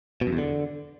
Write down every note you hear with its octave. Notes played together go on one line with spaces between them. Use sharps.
B2
F#2
E2
D3